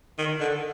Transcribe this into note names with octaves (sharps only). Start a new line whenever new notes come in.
D#3
D3